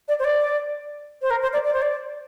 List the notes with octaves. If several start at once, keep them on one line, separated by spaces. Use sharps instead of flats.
D5
C5
D5
C5
A#4
C5
D5
D5
C5
D5